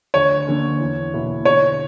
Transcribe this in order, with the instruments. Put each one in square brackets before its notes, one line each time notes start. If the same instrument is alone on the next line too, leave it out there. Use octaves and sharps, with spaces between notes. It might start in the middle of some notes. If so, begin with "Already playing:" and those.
[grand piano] D2 [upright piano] C#5
[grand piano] D3 A#3 C#4
E2
B2 A#3 E4
[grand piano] D3 [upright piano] C#5